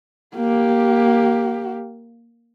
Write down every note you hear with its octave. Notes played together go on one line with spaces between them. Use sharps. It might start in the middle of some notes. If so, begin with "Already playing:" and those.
A#3 G4